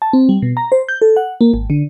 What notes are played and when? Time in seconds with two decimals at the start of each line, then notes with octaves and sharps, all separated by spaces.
0.02 A5
0.13 C4
0.29 G3
0.42 B2
0.57 A#5
0.72 C5
0.89 G6
1.02 A4
1.17 F#5
1.41 A#3
1.54 G#1
1.70 D3